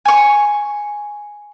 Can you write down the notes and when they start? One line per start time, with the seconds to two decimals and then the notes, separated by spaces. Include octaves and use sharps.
0.05 G#5 C#6